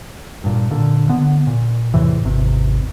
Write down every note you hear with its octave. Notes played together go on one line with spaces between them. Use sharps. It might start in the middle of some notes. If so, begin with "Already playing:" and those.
G2 A#2
A#2 D3
D3 B3
A#2
E2 A2 C3 E3
G#1 E2 C3